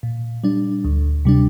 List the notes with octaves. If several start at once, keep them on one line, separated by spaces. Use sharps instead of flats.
A#2
G3 D4
D2
C3 G3 D4